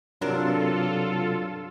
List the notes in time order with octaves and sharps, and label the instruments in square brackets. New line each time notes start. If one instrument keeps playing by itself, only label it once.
[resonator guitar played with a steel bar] G2 D4 A#4 [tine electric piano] C3 F#3 [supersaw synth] F4 A4